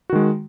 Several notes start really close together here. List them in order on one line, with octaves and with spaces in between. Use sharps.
F#4 D#3 G#3